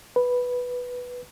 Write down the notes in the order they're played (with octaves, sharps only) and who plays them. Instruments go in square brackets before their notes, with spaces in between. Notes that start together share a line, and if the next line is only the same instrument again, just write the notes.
[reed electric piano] B4